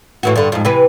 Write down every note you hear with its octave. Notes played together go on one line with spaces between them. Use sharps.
A2 E3 F#4
G2 D3
F2 G#2
C3 E3 B4